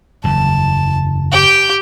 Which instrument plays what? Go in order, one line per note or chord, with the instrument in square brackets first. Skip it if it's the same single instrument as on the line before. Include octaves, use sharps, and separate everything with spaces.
[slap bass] F#1 E2 [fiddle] A5
[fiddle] G4 G5